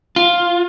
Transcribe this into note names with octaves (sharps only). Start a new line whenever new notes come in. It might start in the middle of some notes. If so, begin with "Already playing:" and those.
F4